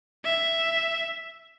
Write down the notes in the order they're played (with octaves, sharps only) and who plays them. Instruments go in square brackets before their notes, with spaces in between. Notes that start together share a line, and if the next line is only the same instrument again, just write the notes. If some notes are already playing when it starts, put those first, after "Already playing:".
[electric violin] E5